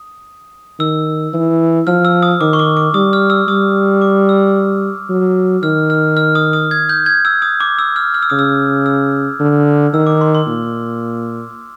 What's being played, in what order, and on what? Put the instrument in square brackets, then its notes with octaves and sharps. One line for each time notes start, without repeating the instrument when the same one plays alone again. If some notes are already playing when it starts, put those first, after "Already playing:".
Already playing: [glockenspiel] D#6
[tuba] D#3 [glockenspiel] E6
[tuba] E3
[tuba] F3 [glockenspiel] F6
[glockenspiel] E6
D#6
[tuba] D#3 [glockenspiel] D6
[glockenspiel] C#6
D6
D6
[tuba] G3 [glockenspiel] D#6
[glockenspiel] F6
E6
[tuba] G3 [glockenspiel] D#6
[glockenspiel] D6
E6
[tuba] F#3
[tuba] D#3 [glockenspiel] F6
[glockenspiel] F6
F6
D#6
D#6
G#6
G6
G#6
E6
D#6
D6
E6
F6
F6
E6
[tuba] C#3 [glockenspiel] D#6
[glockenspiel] E6
E6
[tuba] D3
[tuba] D#3 [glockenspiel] E6
[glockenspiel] D6
C6
C6
[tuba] A#2